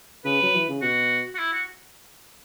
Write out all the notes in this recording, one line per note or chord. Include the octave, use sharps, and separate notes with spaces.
C#3 B4
F#3
E3
C#3
B2 F#4
F#4
E4
F#4